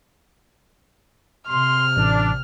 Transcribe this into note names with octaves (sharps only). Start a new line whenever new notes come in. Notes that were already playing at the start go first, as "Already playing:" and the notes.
C3 C6 F6
A1 D4